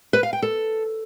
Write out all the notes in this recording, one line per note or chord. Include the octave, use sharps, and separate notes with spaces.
B4
F5
G5
A4